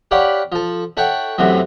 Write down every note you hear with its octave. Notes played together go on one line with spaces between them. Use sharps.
G4 C#5 D5 F5 F#5 B5
F3 A4
E4 A4 C#5 F#5 G5
F#2 A2 C3 E3 F#3